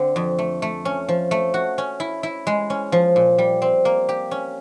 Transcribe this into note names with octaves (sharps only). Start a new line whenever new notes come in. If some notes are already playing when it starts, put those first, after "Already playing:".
Already playing: D3 C4
F2
A3
A3
C#4
F3
A3
F#4
C#4
E4
E4
G#3
C#4
F3
A#2
G3
C4
A#3
G4
C#4